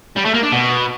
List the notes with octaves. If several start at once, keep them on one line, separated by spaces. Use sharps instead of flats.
G3
A3
A#3
D4
B2